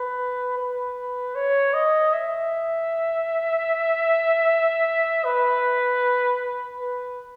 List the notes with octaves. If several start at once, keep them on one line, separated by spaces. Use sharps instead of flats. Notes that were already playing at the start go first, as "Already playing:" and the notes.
Already playing: B4
B4
C#5
D#5
E5
B4
B4